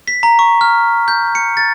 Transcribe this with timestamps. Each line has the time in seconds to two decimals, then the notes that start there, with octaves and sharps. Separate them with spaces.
0.08 B6
0.23 A#5
0.39 C#6
0.61 F6
1.08 G6
1.35 C#7
1.57 A6